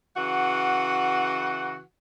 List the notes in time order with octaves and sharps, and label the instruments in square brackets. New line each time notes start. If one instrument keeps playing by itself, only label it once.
[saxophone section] C#3 E3 F#4 F#5